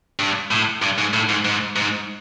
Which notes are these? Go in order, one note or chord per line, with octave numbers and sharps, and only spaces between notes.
G2
A2
G2
G#2
A2
G#2
G#2
G#2